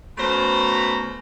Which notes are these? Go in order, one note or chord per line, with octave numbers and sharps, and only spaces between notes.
B2 A3 C#4 C5 A#5 B5